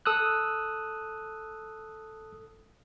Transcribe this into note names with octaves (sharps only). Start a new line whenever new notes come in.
A4 D#6 E6 F#6